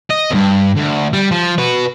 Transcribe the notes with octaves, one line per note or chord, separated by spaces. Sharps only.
D#5
E2 G2
D2
G3
F3
F#4 B4